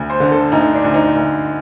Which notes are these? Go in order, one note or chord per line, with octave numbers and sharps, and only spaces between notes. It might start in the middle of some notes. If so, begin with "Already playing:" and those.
Already playing: D2
C5
D3
A4
D2 D#4
D4
D2
D#4
D2